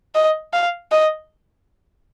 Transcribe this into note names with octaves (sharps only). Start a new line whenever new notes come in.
D#5
F5
D#5